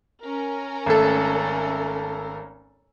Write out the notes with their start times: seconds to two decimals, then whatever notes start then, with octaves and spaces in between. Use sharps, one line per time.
0.22 C#4 A#4
0.86 G#1 A3 A4